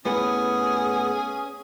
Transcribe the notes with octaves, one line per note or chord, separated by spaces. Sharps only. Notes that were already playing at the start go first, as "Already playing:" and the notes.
A2 B3 C#4 G#4 B4